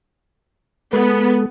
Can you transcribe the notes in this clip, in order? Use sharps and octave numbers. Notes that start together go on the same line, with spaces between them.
G#3 B3 A4 B4